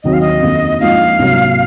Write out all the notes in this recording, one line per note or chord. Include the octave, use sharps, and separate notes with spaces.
D#2 D#3 F#3 C4 F#4 D#5
F5
D#5
F2 D#3 A#3
G#2 F3 A#3 D#4 F5
C2 C3 F#3 A#3